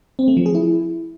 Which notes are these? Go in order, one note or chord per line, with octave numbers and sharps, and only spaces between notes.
C4
A3
F3
G#4
E4